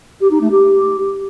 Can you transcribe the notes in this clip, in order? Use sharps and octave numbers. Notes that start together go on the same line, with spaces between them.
G4
D#4
A3
G4